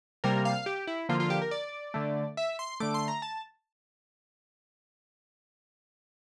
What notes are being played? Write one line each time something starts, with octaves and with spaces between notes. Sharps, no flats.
C3 G3 A#3 A#4
F5
G4
E4
D3 F3 A#3 F4
F4
G4
A#4
D5
D3 A3
E5
C6
D3 A3 D6
C6
A#5
A5